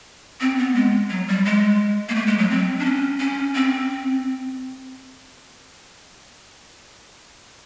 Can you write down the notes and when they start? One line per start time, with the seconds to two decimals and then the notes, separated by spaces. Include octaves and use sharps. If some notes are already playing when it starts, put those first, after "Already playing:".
0.41 C4
0.58 B3
0.75 G#3
1.10 F#3
1.28 G3
1.45 G#3
2.09 A#3
2.15 A3
2.27 G#3
2.38 F#3
2.51 C4
2.79 D4
2.85 C#4
3.20 C#4
3.55 C4